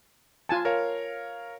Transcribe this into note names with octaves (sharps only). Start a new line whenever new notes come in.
F4 G#5 A5
A#4 C#5 F5